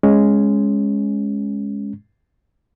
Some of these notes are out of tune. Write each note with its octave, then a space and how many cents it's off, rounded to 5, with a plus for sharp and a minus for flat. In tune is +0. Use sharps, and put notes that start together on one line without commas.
G#3 +0 C#4 +0